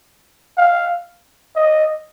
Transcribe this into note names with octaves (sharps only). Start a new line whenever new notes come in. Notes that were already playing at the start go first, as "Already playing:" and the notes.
F5
D#5